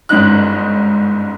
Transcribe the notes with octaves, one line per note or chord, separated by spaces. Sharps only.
G1 G#2 C#4 D#4 F#6